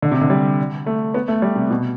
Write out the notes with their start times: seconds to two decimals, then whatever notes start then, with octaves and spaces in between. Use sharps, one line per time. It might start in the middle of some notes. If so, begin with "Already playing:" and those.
0.02 D3
0.11 C3
0.21 D3
0.30 G3
0.86 A3
1.14 B3
1.28 A3
1.42 G3
1.56 C3
1.70 B2